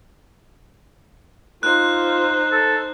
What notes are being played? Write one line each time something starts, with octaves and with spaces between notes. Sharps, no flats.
D#4 F4 C5 F#6
A4